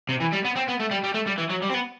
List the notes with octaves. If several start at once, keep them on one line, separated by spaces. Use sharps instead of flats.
C3
E3
G3
B3
C4
B3
A3
G3
G3
A3
G3
E3
F#3
G3
C4
B3